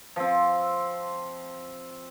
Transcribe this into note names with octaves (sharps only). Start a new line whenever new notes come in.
F3 C4